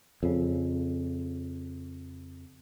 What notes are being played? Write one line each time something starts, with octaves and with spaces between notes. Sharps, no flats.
F2 C#3